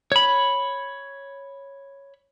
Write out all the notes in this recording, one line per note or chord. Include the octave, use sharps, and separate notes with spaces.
C#5 B5